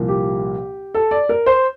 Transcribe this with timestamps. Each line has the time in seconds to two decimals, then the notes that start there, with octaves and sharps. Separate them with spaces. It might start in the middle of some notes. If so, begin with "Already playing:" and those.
Already playing: C2 A#2 F3 A#3
0.08 G4
0.94 A4
1.11 D5
1.29 A#4
1.46 C5